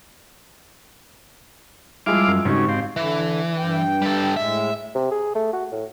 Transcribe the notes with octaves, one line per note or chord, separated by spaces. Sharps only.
F3 G3 G#3 E4 F5 D6 E6
F#2
G#1 G#2 C#3 D#4 F#4 G4 C#6
C4 F5
D3 E3
G2 G5
G3 A4
A2 G#3 E5
C3
G#4
A3
F#4
A2